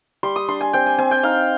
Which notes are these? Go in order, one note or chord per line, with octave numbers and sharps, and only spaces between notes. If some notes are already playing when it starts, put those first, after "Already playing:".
G3 C6
D#6
D4 C6
G#5
C4 G5
G#5
C4 G#5
G5
D#4 F5